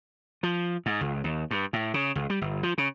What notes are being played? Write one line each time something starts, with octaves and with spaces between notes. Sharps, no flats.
F3
G#2
C#2
D#2
G2
A2
C#3
C#2
G3
G1
F3
C#3